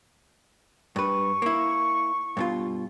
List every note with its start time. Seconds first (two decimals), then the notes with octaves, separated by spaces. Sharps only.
0.96 G2 B4 C#6
1.42 A#3 E4
2.37 G2 B2 F4